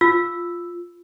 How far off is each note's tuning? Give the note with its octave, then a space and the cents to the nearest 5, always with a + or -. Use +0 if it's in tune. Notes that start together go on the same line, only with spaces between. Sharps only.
F4 +0 E6 +0